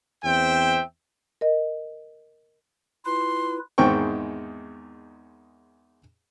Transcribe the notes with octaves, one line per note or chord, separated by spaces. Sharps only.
E2 C4 C5 E5 G5
A#4 D#5
E4 F4 B4 C6
E2 G#2 D#3 C4 G5 C#6